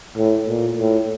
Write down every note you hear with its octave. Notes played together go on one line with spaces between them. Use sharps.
A2
A#2
A2